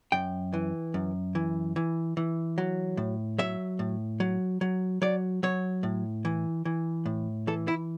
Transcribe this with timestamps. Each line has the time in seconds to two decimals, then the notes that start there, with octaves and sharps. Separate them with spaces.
0.12 F#2 G5
0.53 E3
0.94 F#2
1.35 E3
1.76 E3
2.17 E3
2.58 F#3
2.97 A2
3.38 F#3 E5
3.79 A2
4.20 F#3
4.61 F#3
5.02 F#3 D5
5.43 F#3 C#5
5.83 A2
6.25 E3
6.65 E3
7.06 A2
7.47 E3 A4
7.68 E4